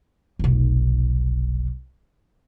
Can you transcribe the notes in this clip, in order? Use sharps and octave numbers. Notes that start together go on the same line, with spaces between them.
F1 B1